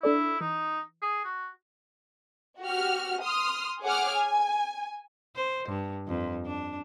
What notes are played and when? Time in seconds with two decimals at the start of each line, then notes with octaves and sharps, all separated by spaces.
0.03 D4 E4 A4 D5
0.41 E3 D#4
1.02 G#4
1.24 F#4
2.62 F#4 G4 F6
3.21 C6 D#6 F6
3.83 G#4 C#5 F#5 D6 F6
4.14 G#5
5.36 C5
5.69 G2
6.08 F2
6.46 D4